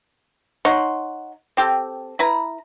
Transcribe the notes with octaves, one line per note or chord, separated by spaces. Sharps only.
D#4 C#5 F#5 C6
C4 G4 A4
E4 B4 A#5